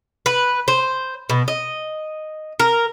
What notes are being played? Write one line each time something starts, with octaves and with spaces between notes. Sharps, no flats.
B4
C5
B2
D#5
A#4